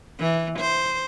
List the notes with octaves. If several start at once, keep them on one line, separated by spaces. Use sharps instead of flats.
E3
C5